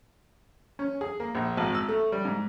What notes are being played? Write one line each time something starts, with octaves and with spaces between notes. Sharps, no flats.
C#4
G#4
A#3
A#1
G#1
E6
A3
G3
G#2